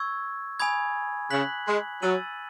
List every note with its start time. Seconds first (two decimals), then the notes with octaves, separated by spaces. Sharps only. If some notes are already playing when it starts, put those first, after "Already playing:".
Already playing: C#6 E6 G#6
0.60 G#5 B5 D#6 G#6
1.30 C#3 F#6 B6 F#7
1.67 G#3
2.02 F#3 E6 A6 D#7 F#7